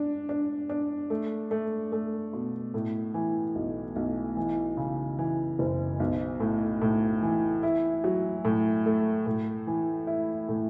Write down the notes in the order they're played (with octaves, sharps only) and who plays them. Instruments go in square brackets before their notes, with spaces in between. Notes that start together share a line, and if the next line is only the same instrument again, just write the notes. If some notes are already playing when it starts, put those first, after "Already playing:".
Already playing: [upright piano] D4
D4
D4
A3
A3
A3
B2
A2
E3
B1
B1
E3
C#3
E3
F#1
B1
A2
A2
E3
E4
F#3
A2
A3
A2
E3
E4
A2